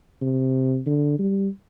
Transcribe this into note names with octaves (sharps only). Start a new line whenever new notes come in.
C3
D3
G3